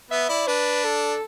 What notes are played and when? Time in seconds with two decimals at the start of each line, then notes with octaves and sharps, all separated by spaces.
0.11 B3 E5
0.29 E4 D5
0.47 D4 B4
0.84 A4